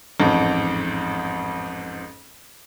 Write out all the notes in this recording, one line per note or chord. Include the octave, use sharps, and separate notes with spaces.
A1 F2 G#2